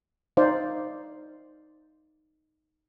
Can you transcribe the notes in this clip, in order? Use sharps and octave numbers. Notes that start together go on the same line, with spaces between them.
D#4 C5 D5 F5